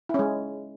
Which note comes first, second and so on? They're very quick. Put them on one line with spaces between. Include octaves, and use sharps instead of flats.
E4 C#4 G#3